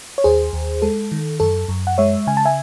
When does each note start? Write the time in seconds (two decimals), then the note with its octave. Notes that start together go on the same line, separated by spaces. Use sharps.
0.18 C#5
0.24 D#2 G#4 C5
0.53 D#2
0.82 G#3 A4
1.12 D#3
1.40 F#2 A4
1.69 F#2
1.87 F#5
1.98 G#3 C#5 E5
2.27 C#3 G#5
2.37 A5
2.45 E5 G#5